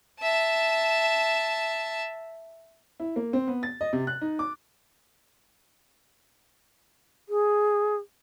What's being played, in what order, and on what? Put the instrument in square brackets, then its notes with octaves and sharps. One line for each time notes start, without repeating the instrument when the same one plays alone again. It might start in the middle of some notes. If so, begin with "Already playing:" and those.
[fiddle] E5 A5
[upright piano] E4
A#3
C4
B3
A6
D#5
C3
F#6
D#4
D6
[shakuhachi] G#4